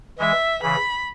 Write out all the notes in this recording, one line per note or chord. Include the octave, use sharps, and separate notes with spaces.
E3 G#3 E5
C#3 E3 B5